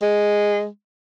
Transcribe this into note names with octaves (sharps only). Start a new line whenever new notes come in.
G#3